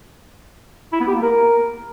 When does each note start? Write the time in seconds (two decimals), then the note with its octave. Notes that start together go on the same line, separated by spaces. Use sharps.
0.93 E4
1.00 B3
1.07 G4
1.15 A#3
1.22 A#4